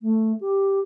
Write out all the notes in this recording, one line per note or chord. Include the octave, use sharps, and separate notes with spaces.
A3
G4